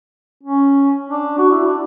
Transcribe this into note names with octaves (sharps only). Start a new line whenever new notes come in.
C#4
D4
F#4
E4
D4